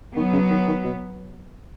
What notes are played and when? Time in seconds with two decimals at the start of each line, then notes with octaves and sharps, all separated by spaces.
0.16 D#3 F#3 B3
0.33 C#3
0.50 D#3
0.67 D#3
0.84 B2